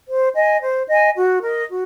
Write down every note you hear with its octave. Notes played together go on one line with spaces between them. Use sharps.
C5
D#5 G#5
C5
D#5 G#5
F#4
A#4 D#5
F#4